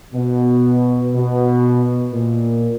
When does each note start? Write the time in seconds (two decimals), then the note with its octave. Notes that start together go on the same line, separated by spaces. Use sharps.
0.14 B2
1.15 B2
2.12 A#2